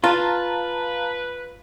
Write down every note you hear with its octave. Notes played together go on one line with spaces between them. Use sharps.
F4 B4 F5 A5 A#5